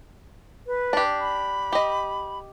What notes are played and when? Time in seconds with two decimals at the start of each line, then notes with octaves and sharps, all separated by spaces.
0.67 B4
0.93 D4 G4
1.20 B5
1.72 G4 D#5